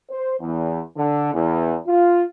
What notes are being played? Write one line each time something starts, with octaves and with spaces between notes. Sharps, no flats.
C5
E2
D3
E2
F4